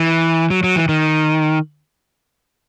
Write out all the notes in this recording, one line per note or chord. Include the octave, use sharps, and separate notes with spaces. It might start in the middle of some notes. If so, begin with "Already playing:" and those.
Already playing: E3
F#3
F#3
E3
D#3